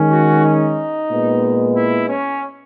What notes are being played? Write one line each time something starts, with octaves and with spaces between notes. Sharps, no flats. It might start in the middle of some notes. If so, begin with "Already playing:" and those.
Already playing: D#3 G#3 C#4
F#4
D#4
A#2 G#3 B3
E4
C#4